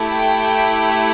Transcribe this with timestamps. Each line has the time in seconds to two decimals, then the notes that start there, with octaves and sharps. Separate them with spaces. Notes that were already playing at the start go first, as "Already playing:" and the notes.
Already playing: A3 E4 G4
0.14 G5